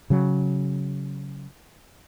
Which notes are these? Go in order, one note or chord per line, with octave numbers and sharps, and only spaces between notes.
C#3 F#3